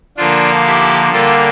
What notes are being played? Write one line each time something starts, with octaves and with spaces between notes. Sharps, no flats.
D3 F3 A#3 D4 F4
E4 G4
D3 G3 A#3 F4 A4